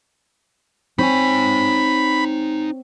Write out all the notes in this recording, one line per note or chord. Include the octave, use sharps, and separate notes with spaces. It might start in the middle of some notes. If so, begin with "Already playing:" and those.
C4 D#4 C#5 G#5 B5